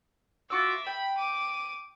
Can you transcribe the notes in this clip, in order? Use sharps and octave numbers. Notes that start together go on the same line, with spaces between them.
F4 F#4 E5 D6 E6
G5 B5
D6 D#7